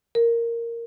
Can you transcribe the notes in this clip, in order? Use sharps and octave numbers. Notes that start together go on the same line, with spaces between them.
A#4